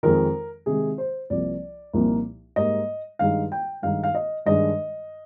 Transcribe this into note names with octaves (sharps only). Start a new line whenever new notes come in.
F2 D#3 G#3 D#4 A#4
C3 D#3 G#3 G#4
C5
C2 C3 F3 A#3 D5
C2 A#2 F3 A#3 D#4
G#2 G3 A#3 D#5
G2 D#3 G#3 D#4 F5
G5
G2 D#3 G#3 D#4 F5
F5
D#5
G2 D#3 G#3 D4 D#5